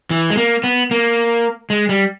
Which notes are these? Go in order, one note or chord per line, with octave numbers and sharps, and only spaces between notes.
E3
G#3
A#3
B3
A#3
G#3
G3